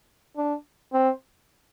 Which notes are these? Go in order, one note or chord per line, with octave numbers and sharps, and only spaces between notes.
D4
C4